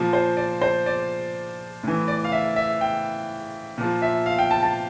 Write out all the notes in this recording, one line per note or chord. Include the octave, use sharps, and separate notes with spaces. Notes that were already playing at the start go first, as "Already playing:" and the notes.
Already playing: A#2 F3
C5
D5
C5
D5
A2 E3
D5
F5
E5
E5
G5
A#2 F3
E5
F5
G5
A5
A5